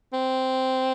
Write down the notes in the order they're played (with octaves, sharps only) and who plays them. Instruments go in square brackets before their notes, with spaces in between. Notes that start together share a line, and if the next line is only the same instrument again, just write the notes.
[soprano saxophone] C4